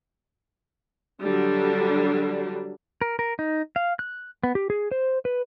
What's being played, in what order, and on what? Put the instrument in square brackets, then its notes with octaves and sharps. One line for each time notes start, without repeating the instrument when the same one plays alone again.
[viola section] D3 F#3 G3 D4
[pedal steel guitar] A#4
A#4
D#4
F5
F#6
B3
G4
G#4
C5
B4